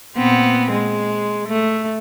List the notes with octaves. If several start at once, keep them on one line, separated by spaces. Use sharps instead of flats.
A#2 B3 C4
G#3
A3